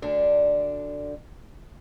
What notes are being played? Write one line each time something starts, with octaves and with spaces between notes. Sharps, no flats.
D2 D3 D4